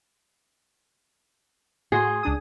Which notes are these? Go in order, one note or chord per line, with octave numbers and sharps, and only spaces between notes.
A2 F#4 G#4 C6
C#2 D4 D#6